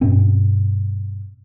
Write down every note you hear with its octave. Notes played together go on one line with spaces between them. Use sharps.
G2 B2 C4 C#4